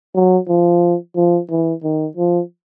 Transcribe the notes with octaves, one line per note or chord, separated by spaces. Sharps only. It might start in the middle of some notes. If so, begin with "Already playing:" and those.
F#3
F3
F3
E3
D#3
F3